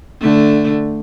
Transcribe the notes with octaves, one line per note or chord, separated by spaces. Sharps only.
D3 A3